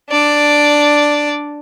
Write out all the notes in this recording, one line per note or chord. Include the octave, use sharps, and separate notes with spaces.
D4 D5